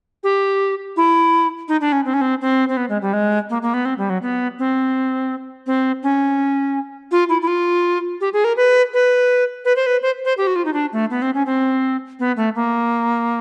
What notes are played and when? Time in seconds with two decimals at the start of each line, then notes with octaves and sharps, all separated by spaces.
0.24 G4
0.97 E4
1.68 D#4
1.81 D4
1.92 C#4
2.05 C4
2.14 C#4
2.21 C4
2.41 C4
2.69 C4
2.77 B3
2.89 G#3
3.02 G3
3.13 G#3
3.50 A#3
3.62 A#3
3.74 B3
3.85 C4
3.98 G3
4.10 F#3
4.22 B3
4.59 C4
5.67 C4
6.03 C#4
7.11 F4
7.29 E4
7.42 E4
7.47 F4
8.21 G4
8.33 G#4
8.44 A#4
8.57 B4
8.93 B4
9.65 B4
9.76 C5
9.86 B4
10.02 C5
10.25 C5
10.38 G4
10.47 F#4
10.56 F4
10.65 D#4
10.73 D4
10.93 A3
11.10 B3
11.22 C4
11.35 C#4
11.46 C4
12.19 B3
12.37 A3
12.55 A#3